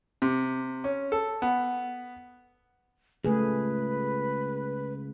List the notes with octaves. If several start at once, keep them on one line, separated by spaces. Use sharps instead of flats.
C3
C#4
A4
B3
C#2 A3 G#4 B4